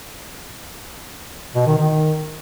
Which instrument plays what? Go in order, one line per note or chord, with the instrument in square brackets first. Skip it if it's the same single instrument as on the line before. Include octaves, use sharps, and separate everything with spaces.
[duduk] B2
D#3
D#3